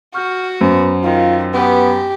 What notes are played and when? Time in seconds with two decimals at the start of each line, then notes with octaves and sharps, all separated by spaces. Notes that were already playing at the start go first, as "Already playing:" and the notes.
0.14 F#4 C#6 F6 G6
0.61 F#2 B3 C5
1.04 D#3 F4
1.54 B3 G4 B4